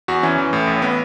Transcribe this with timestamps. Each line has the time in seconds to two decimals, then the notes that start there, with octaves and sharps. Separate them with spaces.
0.08 E2 F#4
0.23 E3 C#4
0.38 E3
0.53 A2
0.67 A1
0.82 B3